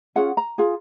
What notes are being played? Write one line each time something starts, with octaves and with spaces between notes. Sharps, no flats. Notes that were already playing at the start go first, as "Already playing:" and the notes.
C#4 F4 G#4 F#5
A#5
F4 G#4